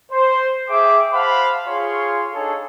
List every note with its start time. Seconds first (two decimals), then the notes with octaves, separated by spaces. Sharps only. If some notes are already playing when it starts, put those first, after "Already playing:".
0.11 C5
0.69 G#4 E5 G5 D6
1.13 C5 F5 F#5 A5 B5
1.67 F4 G#4 C#5 F5 C6 C#6
2.34 D4 D#4 G#4 A4 C#5